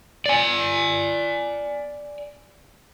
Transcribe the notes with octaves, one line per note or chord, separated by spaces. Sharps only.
D5 G#5